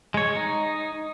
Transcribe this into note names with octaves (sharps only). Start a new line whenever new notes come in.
G#3 C#5
D#4